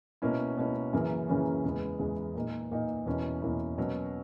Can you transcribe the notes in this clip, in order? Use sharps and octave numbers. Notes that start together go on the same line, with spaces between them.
B2 A#3 C#4 E4
B2 A#3 C#4 E4
F#2 C#3 E3 A#3 C#4
F#2 C#3 E3 A#3 C#4
E2 C#3 G#3 B3
E2 C#3 G#3 B3
A#2 A#3 D#4
A#2 A#3 D#4
E2 B2 A#3 C#4 E4
E2 B2 A#3 C#4 E4
B2 F#3 A#3 C#4